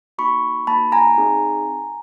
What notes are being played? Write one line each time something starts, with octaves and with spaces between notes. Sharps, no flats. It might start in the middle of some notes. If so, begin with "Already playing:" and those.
A#3 D#4 F#4 B5 C#6
A#3 D#4 F#4 A5 B5
G#5 A#5
C4 D#4 G#4